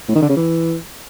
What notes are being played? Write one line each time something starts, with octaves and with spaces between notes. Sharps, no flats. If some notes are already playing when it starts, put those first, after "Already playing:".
A2
D#3
D3
C#3
E3